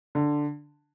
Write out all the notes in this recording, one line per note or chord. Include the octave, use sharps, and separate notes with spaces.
D3